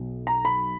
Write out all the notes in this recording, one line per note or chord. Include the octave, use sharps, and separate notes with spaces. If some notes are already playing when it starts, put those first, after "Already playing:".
Already playing: B1 B2 F#3
A#5
B5